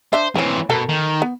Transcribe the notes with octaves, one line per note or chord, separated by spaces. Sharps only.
D4 C5 E5
E3 A3 C4 C#4
B2 A4 A#4
D#3
B3